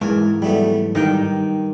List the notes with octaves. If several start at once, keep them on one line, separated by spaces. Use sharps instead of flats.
G#2 E3 G#3 A#4 G#5
F#3 G3 A3 B3
G2 D#3 D#4 G5